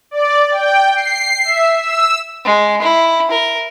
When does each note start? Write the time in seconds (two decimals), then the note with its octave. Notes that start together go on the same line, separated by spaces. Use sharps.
0.11 D5
0.51 G5
0.96 C7
1.45 E5
1.78 E6
2.45 G#3
2.82 E4
3.31 A#4